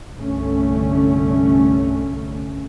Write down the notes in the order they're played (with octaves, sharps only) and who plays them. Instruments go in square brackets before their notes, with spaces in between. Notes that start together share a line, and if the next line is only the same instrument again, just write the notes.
[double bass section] C2 G2 D3 A3 C#4